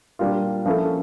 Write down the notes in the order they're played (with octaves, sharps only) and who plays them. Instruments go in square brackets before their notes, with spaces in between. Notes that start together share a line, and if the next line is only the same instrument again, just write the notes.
[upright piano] A#2 G3 A#3 D4 F4
F3 A#3 C#4 E4 A4